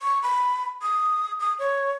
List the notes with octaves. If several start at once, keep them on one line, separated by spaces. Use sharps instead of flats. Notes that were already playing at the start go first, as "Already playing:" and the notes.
C#6
B5
D#6
D#6
C#5